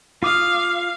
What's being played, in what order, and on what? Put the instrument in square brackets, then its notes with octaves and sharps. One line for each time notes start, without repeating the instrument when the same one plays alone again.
[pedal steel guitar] F4 D6 D#6 [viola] F5